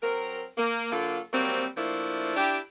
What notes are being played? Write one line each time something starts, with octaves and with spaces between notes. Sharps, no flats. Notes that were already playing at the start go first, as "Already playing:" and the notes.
F#3 C4 A#4
A#3
D3 F#3 A#3 F4 A4
F#3 G3 A#3 C4
F3 A3 A#3 D4 E4
D4 E4 G4